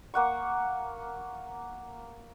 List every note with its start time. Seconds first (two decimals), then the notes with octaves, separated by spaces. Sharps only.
0.14 A#3 F#5 C#6